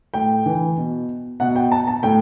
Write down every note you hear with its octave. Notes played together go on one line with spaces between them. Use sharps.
A2 G5
E3
B2
B2 F#5
G5
A5
A5
A2 G5